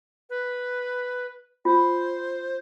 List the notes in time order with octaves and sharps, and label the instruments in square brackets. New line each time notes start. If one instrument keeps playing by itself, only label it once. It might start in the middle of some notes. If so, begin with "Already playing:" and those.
[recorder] B4
[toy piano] F4 [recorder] C5